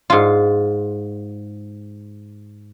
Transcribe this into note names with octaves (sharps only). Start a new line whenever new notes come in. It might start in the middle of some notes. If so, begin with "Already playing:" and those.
G#2 F4